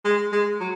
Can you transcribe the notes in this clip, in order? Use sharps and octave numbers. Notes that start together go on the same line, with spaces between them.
G#3
G#3
F#3